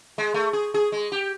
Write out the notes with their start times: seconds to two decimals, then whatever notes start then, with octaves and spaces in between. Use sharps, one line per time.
0.18 G#3
0.34 A3
0.53 G#4
0.74 G#4
0.92 G#3
1.12 G4